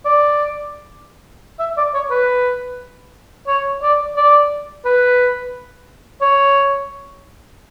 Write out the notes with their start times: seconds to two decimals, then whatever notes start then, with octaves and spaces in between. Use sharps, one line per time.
0.06 D5
1.59 E5
1.77 D5
1.94 C#5
2.10 B4
3.47 C#5
3.83 D5
4.17 D5
4.85 B4
6.22 C#5